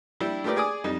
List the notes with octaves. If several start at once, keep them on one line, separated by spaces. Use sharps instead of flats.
G3 D4 E4 G4
A3 F4 G4 A#4 B4 D5
G#4 D5 G#5 D6 D#6
F2 G3 D#4